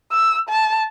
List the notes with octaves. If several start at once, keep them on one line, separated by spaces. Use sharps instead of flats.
E6
A5